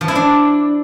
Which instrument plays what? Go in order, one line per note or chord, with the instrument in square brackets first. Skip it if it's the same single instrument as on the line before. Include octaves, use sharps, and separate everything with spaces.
[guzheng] F3
E4
D4